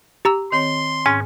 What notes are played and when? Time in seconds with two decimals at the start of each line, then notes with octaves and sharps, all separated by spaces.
0.25 G4 A#5 E6
0.52 D#3 C4 C#5 C6
1.06 G#2 C#4 G#5